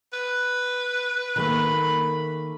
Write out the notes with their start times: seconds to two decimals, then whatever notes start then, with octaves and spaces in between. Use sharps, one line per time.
0.13 B4
1.36 D#3 A3 A#3 B5